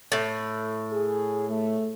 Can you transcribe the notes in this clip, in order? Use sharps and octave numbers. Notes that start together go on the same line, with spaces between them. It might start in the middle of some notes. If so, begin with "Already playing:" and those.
A2
G#4
A3